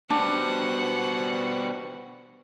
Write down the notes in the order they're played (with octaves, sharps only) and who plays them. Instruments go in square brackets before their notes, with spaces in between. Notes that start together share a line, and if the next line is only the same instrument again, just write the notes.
[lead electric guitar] B2 G3 [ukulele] D4 [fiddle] C5 F#5